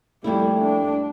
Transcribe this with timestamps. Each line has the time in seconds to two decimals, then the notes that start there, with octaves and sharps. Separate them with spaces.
0.24 F2 G3 A3 A#3 E4
0.61 D4